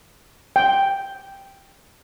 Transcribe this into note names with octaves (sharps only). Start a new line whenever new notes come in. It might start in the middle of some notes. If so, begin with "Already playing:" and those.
G5